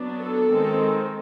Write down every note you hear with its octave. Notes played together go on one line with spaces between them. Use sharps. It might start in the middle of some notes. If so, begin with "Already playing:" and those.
Already playing: F#3 B3 D4
A4
D#3 G#3 C4